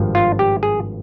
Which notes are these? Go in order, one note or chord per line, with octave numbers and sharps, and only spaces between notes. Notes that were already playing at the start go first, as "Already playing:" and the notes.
Already playing: G#1 G2 F3
F4
G4
G#4